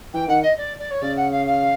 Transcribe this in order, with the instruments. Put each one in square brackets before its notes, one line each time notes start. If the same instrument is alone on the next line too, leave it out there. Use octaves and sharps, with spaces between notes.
[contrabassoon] E3 [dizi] G5
[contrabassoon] D#3 [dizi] F#5
[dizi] D#5
D5
D5
C#5
[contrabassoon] C#3 [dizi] D5
[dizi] F#5
F5
F5